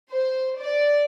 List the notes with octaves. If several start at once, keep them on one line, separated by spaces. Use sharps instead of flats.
C5
D5